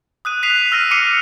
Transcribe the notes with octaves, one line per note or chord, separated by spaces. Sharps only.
D#6 F#6 D#7
F#6 B6 C7 D#7 F7
E6 F6 A#6 B6 D#7
D6 F6 C7 C#7 D#7 F7